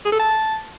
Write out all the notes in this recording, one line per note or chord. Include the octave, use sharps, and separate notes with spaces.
G#4
A4
A5